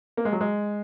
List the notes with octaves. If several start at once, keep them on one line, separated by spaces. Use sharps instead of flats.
A#3
G#3
F#3
G#3